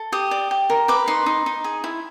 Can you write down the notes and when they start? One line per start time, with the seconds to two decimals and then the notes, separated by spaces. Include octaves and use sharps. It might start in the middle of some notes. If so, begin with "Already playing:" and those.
Already playing: A4
0.12 G4 D#6
0.31 D5
0.51 G4
0.70 A#4
0.88 B4 D6
1.08 D#4 C6
1.26 D#4
1.46 D#4
1.64 G#4
1.84 E4